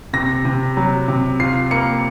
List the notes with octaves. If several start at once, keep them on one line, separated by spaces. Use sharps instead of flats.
C3 A#6
C3
F#3
C3
F4 C7
A#3 C#7